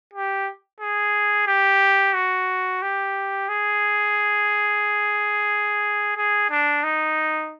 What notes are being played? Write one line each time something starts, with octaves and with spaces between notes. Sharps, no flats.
G4
G#4
G4
F#4
G4
G#4
G#4
D4
D#4